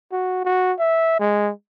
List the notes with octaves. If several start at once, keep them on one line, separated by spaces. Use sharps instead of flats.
F#4
F#4
E5
G#3